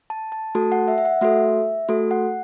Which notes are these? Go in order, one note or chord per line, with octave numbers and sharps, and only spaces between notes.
A5
A5
A3 F#4 A4 A5
F#5
E5
E5
F#5
A3 F#4 A4 E5
A3 F#4 A4
F#5